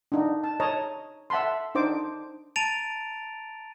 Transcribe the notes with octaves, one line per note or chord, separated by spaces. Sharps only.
D4 D#4
A5
C#5 D#5 A5 A#5
E5 F#5 A5 B5 C6
D4 D#4 C5 D6
A5 A#5 A6 D7 D#7 F7